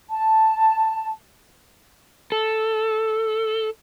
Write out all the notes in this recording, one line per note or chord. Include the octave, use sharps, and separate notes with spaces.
A5
A4